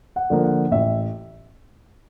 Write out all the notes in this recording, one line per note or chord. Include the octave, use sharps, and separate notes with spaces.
F#5
D3 F3 A#3
F#5
A1 E5